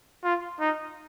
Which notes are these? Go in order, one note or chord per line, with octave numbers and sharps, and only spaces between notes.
F4
D#4